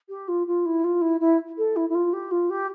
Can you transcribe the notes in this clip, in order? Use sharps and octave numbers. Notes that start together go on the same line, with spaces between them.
G4
F4
F4
E4
F4
E4
E4
A4
E4
E4
F4
G4
F4
G4